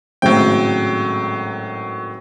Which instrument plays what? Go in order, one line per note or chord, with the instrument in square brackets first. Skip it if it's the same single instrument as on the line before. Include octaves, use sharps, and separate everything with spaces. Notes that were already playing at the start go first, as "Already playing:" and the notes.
[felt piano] G#1 A2 C#3 [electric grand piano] F#3 G5